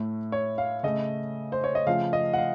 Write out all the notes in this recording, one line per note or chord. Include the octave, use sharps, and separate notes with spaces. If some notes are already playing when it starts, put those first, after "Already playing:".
Already playing: A2 A3
C#5
F5
C#3 A3 D#5
C5
C#5
D#5
C#3 F3 A3 F5
D#5
F#5
F5